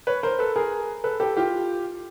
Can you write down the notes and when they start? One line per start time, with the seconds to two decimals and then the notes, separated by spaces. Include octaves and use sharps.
0.07 B4 C#5
0.23 A#4 C5
0.39 A4 B4
0.56 G#4 A#4
1.04 A4 B4
1.20 G4 A4
1.37 F4 G4